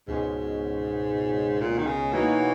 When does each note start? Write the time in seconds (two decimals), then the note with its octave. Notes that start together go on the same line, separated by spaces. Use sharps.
0.08 C#2 G#2 B2 G#3 C#4
1.61 A#2
1.78 D#3
1.87 C#3
2.12 B2 E3 A#3 D#4 F#4 C#5